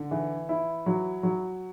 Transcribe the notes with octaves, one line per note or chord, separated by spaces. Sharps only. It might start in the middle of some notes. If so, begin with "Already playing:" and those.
Already playing: D3
E3
E4
F#3
F#3